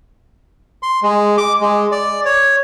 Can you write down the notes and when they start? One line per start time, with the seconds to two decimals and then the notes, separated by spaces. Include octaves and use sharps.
0.83 C6
1.03 G#3
1.38 D6
1.61 G#3
1.92 D5
2.25 C#5